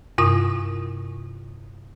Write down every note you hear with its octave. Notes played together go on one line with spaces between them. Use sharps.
G2 C3 F4 D#6